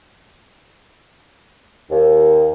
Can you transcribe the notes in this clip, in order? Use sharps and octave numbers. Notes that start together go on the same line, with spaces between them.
D#2